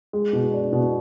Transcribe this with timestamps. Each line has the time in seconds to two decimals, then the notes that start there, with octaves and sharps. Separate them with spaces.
0.13 G#3
0.33 B2
0.53 D4
0.73 B2